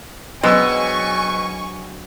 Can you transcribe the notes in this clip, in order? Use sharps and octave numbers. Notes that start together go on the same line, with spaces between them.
B2 F#3 G#3 C4 D4 G#5 C#6 E6